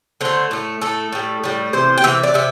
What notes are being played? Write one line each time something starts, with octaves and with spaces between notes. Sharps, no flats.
D3 A3 C5
A2 A3
A2 A3 A4
A2 G3
A2 G3
C3 E3 C5
G5
C3 E3 E5
D5
C3 E5